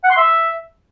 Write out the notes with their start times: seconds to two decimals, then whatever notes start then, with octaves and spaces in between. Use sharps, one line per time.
0.04 F#5
0.11 C6
0.17 E5